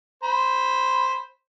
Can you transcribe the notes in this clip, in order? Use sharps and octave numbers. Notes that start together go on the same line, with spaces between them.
C5 B5